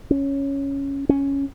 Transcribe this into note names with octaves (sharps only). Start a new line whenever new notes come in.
C#4
C#4